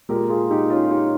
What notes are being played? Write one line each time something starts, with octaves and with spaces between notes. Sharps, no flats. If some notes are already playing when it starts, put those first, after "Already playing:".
A#2 G#3 G4 A#4
F4 G#4
D#4 G4
C#4 F4
D#4 G4